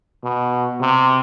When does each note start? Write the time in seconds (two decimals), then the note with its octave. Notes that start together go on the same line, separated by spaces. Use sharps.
0.23 B2
0.81 C3